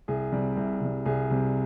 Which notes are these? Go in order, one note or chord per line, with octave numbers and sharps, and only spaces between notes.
C2 G#4
C3 G3
C2
C3 G3
C2 G#4
C3 G3